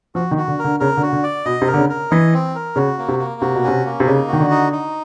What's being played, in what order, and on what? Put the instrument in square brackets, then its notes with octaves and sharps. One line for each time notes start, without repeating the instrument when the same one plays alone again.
[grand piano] F3 [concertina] F#4
[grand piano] D#3
[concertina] F#4
[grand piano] D3
[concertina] A#4
[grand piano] D3
[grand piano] C#3 [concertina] A#4
[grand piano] D3
[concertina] F#4
[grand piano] D3
[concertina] D5
[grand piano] B2 [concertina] D#5
[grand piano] C3
[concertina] A#4
[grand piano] D3
C#3
[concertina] A#4
[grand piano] E3 [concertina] D#5
[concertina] C4
A#4
[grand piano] C#3 [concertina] F#4
[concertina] A#3
[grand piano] C3
[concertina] A#3
[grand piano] C3 [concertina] F#4
[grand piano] B2
[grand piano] C3 [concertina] C#4
[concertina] A#3
[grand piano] C3
[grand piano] C#3 [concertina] D#4
[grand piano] D#3 [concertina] F#4
[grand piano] D3
[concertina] D#4
D#4